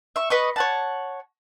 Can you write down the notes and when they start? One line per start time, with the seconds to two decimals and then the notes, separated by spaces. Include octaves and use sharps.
0.16 E5 C#6
0.30 B4 D#5 C#6
0.56 C#5 F#5 A5